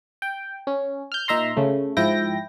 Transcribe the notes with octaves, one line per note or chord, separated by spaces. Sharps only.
G5
C#4
F6 G6
A#2 D#4 E5 A#5 C6
C#3 A3
G#2 F3 E4 G5 A#6